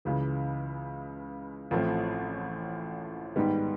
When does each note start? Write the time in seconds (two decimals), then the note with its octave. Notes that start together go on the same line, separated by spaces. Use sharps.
0.05 C#2 C#3 E3
1.71 A1 A2 F3 A3 C4
3.36 G#2 D#3 G3 B3 D#4